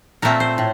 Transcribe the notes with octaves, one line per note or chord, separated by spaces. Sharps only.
A#2 A3 C4 A#4
C5
A2